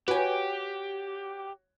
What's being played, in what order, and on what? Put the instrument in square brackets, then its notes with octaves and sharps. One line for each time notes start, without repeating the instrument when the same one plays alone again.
[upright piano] F#4 C#5 [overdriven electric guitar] G4 [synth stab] B4 G#5